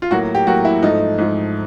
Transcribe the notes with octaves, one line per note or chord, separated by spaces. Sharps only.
F4
A2 F#3 A#3 F#4
G4
A2 F#3 A#3 F#4
E4
G#2 F3 A3 D#4
G#2 F3 A3